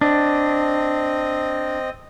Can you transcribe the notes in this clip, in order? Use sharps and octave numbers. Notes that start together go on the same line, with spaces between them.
C4 D4 D#5